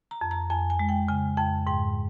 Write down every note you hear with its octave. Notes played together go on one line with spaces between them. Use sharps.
A#5
F2
A#5
F2 G#5
G#5
G#3
G5
C#3 G#5
F2 G5
G#2 G5